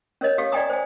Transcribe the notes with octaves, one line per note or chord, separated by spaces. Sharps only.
C#4 A#4 C#5 D#5
G4 A4 F5
D5 D#5 G5 G#5 A#5 D#6
C5 G#5